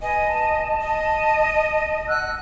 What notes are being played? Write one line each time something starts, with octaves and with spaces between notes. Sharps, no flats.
B4 D#5 G#5
A5
D#5
F#5 E6 F#6